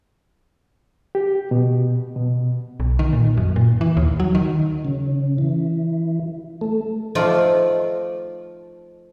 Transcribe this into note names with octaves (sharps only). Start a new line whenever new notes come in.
G4
B2
B2
B1
D#3
A#2
F#2
A#2
E3
D#2
F#3
D#3
C#3
E3
A3
F3 A3 D#4 F4 D5